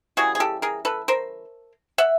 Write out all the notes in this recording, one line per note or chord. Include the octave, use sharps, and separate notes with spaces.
C#3 E3 G3 F#4 G#4
G#4
G4 A4
G#4 A#4
A4 B4
A#4 C5
E5 F#5